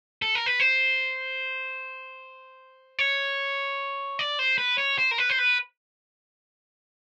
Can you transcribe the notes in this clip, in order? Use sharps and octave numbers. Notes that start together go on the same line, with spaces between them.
A4
A#4
B4
C5
C#5
D5
C5
B4
C#5
C5
A#4
B4
C5
B4